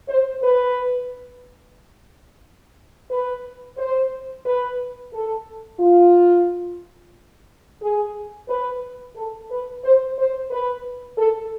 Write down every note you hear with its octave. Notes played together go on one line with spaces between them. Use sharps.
C5
B4
B4
C5
B4
A4
F4
G#4
B4
A4
B4
C5
C5
B4
A4